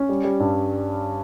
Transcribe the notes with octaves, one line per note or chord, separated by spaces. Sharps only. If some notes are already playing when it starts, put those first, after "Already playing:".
Already playing: C#4
G3
G3
G2